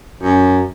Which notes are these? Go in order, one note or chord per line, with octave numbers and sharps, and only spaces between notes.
F#2